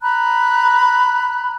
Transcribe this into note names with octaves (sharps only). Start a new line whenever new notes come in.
A#5 B5 F#6